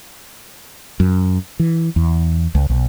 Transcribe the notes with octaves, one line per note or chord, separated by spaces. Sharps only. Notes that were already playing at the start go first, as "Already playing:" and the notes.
F#2
E3
E2
C#2
B1